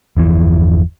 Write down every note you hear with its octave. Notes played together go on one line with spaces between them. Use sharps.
G1 E2 E3 F3